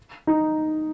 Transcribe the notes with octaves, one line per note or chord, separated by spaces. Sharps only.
D#4